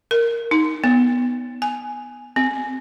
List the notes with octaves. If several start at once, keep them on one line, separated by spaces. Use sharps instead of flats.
A#4
D#4
B3
G#5
C4